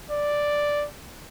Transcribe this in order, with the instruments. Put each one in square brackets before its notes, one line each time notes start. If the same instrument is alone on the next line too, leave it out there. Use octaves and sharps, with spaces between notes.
[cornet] D5